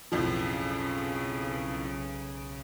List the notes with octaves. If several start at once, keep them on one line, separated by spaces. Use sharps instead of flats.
B1 F2 A2 C#3 F3